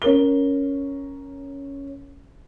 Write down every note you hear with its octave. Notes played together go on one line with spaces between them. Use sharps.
C#4 A#4 G7